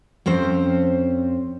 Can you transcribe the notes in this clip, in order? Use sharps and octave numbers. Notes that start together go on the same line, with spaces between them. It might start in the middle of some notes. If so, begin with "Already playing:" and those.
F2 C4 C#4 C5